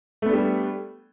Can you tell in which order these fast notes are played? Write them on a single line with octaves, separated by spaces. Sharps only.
A3 B3 D4 G3